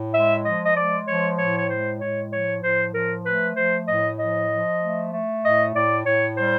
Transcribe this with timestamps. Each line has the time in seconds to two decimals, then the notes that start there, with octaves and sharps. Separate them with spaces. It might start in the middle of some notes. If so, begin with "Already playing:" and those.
Already playing: A2
0.13 G#3 E5
0.45 F3 D#5
0.64 D#5
0.76 G#3 D5
1.07 F3 C#5
1.37 A2 C#5
1.57 C#5
1.69 G#3 C5
2.00 A2 C#5
2.31 F3 C#5
2.62 A2 C5
2.93 F3 A#4
3.25 A3 B4
3.56 F3 C5
3.87 A2 D#5
4.18 F3 D#5
4.50 F3
4.80 A3
5.11 A3
5.44 A2 D#5
5.74 A2 D5
6.05 A2 C#5
6.37 G3 C5